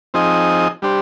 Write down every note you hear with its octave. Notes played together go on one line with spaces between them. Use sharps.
F3 C4 D#4 G#4 D#5
G3 D4 G4 C5